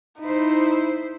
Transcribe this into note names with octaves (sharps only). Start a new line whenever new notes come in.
D#4 E4 C5